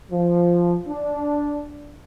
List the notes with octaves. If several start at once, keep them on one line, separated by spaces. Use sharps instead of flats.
F3
D4